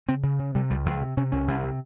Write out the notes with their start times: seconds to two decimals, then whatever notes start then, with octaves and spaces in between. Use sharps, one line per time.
0.08 C#3 C4
0.23 C#3
0.39 C#3
0.55 C3 G3
0.70 C#2 G3
0.85 C#2 F3
1.01 C3
1.17 C3 C#4
1.32 C2 C#4
1.48 C2
1.63 C3